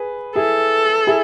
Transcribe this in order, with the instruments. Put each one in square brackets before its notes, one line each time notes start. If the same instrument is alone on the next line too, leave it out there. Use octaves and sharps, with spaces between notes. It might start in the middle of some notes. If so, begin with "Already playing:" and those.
Already playing: [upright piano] G#4 B4
[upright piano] E4 G#4 [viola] A4
[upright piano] E4 G#4